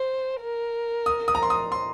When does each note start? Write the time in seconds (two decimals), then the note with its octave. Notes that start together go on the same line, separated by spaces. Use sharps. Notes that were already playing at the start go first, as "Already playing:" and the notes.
Already playing: C5
0.41 A#4
1.06 D#6
1.28 D#6
1.35 A#5
1.43 C6
1.50 D#6
1.72 C6